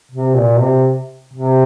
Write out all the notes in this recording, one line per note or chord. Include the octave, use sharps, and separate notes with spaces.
C3
A#2
C3
C3